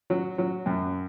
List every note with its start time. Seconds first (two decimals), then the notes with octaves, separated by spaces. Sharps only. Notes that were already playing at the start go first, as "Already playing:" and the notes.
0.10 F#3
0.38 F#3
0.66 F#2